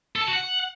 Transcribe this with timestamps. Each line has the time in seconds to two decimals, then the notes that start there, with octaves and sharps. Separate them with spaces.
0.16 A4
0.21 A5
0.27 F#4
0.33 F#5